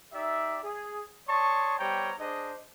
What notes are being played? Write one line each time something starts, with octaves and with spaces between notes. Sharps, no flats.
D#4 G4 D5 E5
G#4
C#5 D5 A5 C6 C#6 D#6
G3 B3 C5 C#5 G5 A#5
D4 G#4 C5 D#5